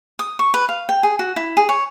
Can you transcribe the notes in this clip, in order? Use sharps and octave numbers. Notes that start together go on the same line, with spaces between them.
D#6
C#6
B4
F5
G5
G#4
F#4
E4
G#4
C#5